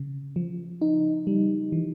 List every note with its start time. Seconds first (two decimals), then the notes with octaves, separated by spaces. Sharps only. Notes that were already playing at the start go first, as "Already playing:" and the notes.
Already playing: C#3
0.36 F3
0.81 D#4
1.27 G3
1.72 E3